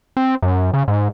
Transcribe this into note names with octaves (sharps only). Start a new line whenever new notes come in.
C4
F#2
C#3
G#2